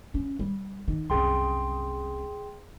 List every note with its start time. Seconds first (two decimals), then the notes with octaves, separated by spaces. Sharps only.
0.14 C#4
0.39 G3
0.88 D#3
1.10 C2 F#2 G#4 G5 C6